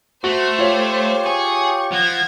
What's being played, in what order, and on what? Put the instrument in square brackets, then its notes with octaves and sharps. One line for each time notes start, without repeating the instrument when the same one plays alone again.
[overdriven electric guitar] A3 [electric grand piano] F#4 [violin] C5
[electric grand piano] F4 C#5 [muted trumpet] G4
[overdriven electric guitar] G#4 [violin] C#6
[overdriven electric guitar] F3 [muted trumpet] F#5 [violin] G#6 A#6